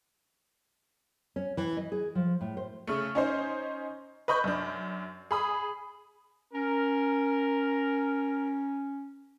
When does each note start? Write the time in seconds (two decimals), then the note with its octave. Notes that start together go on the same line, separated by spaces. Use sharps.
1.36 C#4
1.57 E3
1.77 D#5
1.92 G#4
2.15 F3
2.41 A2
2.57 C5
2.87 C#3 A3
3.15 C#4 D#4 C5
4.28 B4 D#5 B5 C#6 G6
4.44 F#2 D4
5.31 G#4 B5 D#6
6.53 C#4 A#4